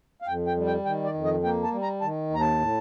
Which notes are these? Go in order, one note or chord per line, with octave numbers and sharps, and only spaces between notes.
F5
F2 G5
G5
G3
G5
D#3 G5
D5
F2
D#5
A#3 G5
A5
G3
A#5
D#3 A5
D#2 A#5
A5
A2